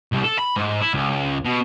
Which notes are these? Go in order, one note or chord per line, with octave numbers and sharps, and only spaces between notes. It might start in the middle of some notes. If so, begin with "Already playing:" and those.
C2
A4
B5
G#2
E4
C#2
B2